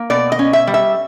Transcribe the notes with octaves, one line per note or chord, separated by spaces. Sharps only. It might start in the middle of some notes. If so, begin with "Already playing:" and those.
Already playing: A#3
B2 D5
D#5
C#4
E5
G3
E5